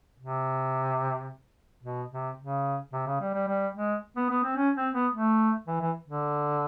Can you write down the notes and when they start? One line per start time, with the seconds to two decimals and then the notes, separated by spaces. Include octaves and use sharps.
0.20 C3
1.84 B2
2.11 C3
2.39 C#3
2.93 C3
3.07 C#3
3.21 G3
3.34 G3
3.48 G3
3.76 G#3
4.16 B3
4.30 B3
4.43 C4
4.57 C#4
4.76 C4
4.94 B3
5.13 A3
5.67 E3
5.81 E3
6.08 D3